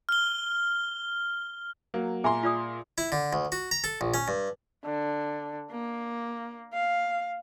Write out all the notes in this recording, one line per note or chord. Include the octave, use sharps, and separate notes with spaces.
F6 G7
F#3 A#3
A#2 G#4 E5 G#5 A#5 C6
F4 D5 D#6
E4
D3
D2
F#4
A#5
A4
A#1
C#4
G2
D3
A#3
F5